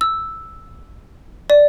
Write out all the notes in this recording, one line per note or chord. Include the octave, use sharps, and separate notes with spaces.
E6
D5